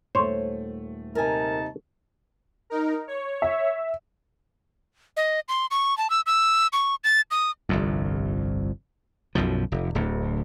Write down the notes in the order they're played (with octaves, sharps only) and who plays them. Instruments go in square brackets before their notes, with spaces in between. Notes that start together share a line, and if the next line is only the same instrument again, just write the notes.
[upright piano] D#1 A3 [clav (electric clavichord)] C5 C#5
[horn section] C3 D#4 A5 [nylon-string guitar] A#4 G#5
[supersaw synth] D#4 A#4
C#5
[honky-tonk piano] E5
[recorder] D#5
C6
C#6
A5
E6
E6
C#6
A6
D#6
[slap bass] G1 C2 F2
B1 F#2 B2 F3
F1
D1 D2